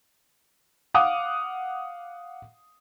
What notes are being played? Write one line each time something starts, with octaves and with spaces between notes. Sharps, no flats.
F5 F#5 D6 D#6